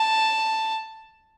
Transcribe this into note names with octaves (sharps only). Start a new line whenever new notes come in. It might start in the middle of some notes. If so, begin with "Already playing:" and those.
Already playing: A5